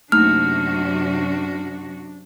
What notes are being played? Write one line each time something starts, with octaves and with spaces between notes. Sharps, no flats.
F#2 C3 A3 A#3 D4 D#4 F#4 F6